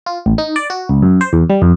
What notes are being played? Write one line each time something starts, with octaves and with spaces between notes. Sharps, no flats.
F4
A1
D#4
D5
F#4
C#2
F#2
C5
E2
G3
F2